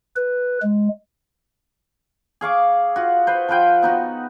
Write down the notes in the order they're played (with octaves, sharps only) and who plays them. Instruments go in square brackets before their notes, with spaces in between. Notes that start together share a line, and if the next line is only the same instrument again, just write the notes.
[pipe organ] B4
G#3
[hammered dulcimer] G#4 F5 C#6 D6
F4 F#4
B4 C5
F3 F4 B4 G5
B3 D#4 F#4